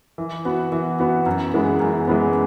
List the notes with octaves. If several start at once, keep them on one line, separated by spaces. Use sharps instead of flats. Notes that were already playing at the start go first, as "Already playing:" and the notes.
E3
B3 F#4
E3
B3 F#4
F#2
E3 G#3 B3
F#2
E3 G#3 B3